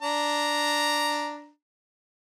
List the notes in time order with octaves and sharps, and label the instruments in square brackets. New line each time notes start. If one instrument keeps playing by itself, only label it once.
[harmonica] D4 A#5